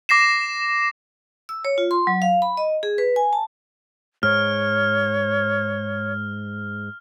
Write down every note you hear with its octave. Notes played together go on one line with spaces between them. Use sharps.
D6 A#6 C7 E7
E6
C#5
F4
C6
F#3
F5
B5
D#5
G#4
B4
G#5
A5
G#2 C#5 F6